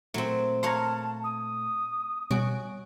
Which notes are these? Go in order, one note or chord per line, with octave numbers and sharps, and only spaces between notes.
A#2 F#3 A3 C4
C#5 F5 F#5 A5 A#5 C6
D#6
B2 G3 F#4 C#5 G#5 C#6 D7